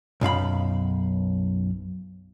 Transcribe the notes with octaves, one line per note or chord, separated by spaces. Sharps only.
B1 F#2 F5 B5